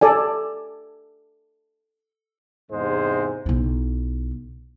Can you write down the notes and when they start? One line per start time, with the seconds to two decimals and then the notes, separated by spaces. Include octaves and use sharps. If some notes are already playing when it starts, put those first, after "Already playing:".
0.01 A4 D5 G#5
2.71 E2 G#2 C3 G#3 C5
3.46 B1 E4